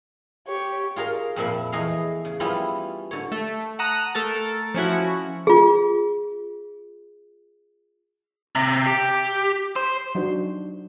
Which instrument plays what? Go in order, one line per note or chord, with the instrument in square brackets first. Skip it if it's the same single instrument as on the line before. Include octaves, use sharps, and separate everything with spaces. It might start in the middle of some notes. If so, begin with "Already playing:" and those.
[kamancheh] G4 [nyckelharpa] C#5
[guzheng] F4 G#4 A#4 F5
F2 A#2 F3 E5 B5
E2 A3 G#4 D#5 F5
C#3
F3 G3 B3 C#4 E4 F4
D3 C#5
[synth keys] A3
F#5 A5 A#5 D#6 F#6
A3 A4 A#4 A5 A6
F3 C#4 E4 F#4
[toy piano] F4 G#4
[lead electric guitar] C3
G4
C5
[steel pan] F#3 D4 D#4 F#4 C5